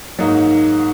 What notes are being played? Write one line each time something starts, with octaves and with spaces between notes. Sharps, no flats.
G#2 F#3 A#3 D#4